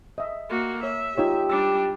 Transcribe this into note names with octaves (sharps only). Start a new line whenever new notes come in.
D#5 E5
A#3 F#4
C#5 E5
D#4 F4 G4 C#5
G3 D4 E6